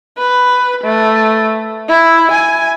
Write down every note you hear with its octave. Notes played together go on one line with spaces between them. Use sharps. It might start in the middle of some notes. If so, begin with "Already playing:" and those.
B4
A3
E4
G#5